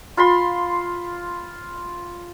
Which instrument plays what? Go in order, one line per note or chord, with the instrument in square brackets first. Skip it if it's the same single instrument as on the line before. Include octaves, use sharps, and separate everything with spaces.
[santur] F4 B5 C6